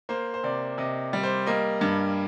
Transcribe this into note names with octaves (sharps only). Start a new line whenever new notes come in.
A#3 C5
C5
C3 D5
C3 D#5
G3
C5
A#3 D#5
G2